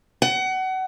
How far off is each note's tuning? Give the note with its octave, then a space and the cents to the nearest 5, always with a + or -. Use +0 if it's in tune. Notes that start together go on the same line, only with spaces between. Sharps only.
F#5 +30